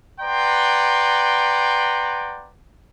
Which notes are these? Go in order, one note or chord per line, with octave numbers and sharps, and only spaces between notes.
B4 D5 F#5 G5 A#5 C6